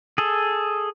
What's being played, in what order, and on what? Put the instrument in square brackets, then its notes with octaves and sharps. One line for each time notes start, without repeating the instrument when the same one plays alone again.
[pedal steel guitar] G#4 A4